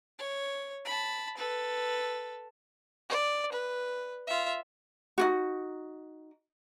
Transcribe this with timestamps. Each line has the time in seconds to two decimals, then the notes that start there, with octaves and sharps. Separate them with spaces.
0.19 C#5
0.85 A5 B5
1.37 A4 B4
3.10 D5
3.52 B4
4.27 F4 E5
5.18 D#4 F4 F#4